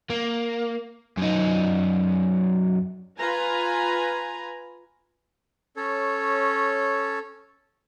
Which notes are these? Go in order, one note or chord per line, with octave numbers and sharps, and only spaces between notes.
A#3
F#2 D#4
F4 B4 G#5 A#5
C#4 A4 C#5